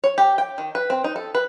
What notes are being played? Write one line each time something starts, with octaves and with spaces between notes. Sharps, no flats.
C#5
G4
G5
D#3
B4
C4
D#4
A4
B4